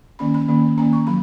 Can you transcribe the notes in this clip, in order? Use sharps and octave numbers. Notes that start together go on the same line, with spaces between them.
D#3 A#3 C#4 B5
B5
D#3 A#3 C#4
D#3 A#3 C#4 A#5
C#6
F#3 B5